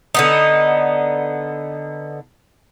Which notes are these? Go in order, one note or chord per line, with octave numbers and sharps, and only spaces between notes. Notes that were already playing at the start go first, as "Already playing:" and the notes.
D3 B3 D#4